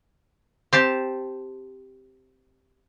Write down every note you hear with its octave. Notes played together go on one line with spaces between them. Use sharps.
C4 G4 A5